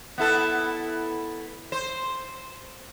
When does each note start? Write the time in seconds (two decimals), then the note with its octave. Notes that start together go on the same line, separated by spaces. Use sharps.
0.18 B3 E4 A4
1.72 C5